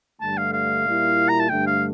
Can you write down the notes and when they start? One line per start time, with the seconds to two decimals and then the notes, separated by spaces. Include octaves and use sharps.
0.21 G2 D3 A3 A5
0.37 F5
0.53 F5
0.86 A#2 G3 A#3 E4
1.29 A#5
1.40 A5
1.49 G2 D3 A3 G5
1.67 F5